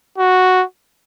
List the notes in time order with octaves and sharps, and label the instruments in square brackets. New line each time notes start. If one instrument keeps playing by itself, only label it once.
[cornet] F#4